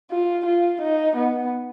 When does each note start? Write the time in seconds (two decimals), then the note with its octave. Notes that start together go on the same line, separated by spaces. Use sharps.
0.11 F4
0.45 F4
0.81 D#4
1.16 B3